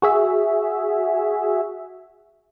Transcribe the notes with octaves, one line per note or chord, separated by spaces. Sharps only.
F#4 G#4 E5